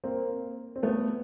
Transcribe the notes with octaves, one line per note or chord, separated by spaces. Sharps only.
A#3 C4
C4
A3 B3